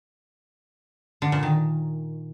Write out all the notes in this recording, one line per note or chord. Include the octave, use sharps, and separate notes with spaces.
D3
A#2
D#3